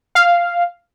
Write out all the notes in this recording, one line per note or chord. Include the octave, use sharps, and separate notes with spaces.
F5